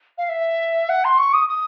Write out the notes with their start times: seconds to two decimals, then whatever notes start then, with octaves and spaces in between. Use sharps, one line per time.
0.18 F5
0.29 E5
0.89 F#5
1.04 C6
1.18 C#6
1.33 D#6
1.49 D#6